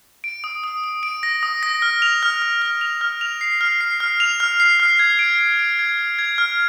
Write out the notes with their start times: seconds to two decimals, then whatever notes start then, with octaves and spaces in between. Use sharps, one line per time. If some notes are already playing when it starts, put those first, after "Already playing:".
0.24 D7
0.44 D#6
0.64 D#6
0.84 D#6
1.03 D7
1.23 A#6
1.43 D#6
1.63 A#6
1.82 F6
2.02 F7
2.23 F6
2.42 F6
2.62 F6
2.81 F7
3.01 F6
3.21 F7
3.41 C7
3.61 F6
3.81 C7
4.00 F6
4.20 F7
4.40 F6
4.60 C7
4.80 F6
4.99 G#6
5.19 D7
5.39 D7
5.59 D7
5.79 G#6
5.98 G#6
6.19 G#6
6.38 F6